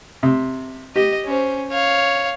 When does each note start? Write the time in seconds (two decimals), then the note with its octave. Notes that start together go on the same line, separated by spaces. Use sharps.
0.23 C3
0.96 G4 D#5
1.26 C#4 C5
1.70 C#5 F5